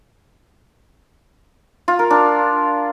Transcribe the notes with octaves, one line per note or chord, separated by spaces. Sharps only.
F4
A#4
D4